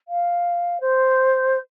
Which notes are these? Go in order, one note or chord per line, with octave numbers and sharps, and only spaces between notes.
F5
C5